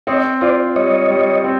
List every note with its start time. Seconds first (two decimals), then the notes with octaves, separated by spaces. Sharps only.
0.07 C4 C#5 D#5
0.41 F4 C5 D5
0.76 G3 C#5 D#5
1.10 G3
1.44 C4